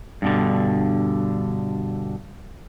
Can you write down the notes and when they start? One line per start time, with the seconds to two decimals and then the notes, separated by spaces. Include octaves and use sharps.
0.22 G2 B2 D3